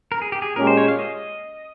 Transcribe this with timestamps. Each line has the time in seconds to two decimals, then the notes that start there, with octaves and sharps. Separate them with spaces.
0.12 A#4
0.22 G#4
0.32 G4
0.42 G#4
0.56 A#2 G#3 C#4 G4 A#4
0.67 C5
0.77 C#5
0.88 F5
0.99 D#5